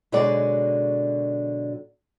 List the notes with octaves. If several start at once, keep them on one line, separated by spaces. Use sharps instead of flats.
B2 D3 F#3 G#3 D#4 D5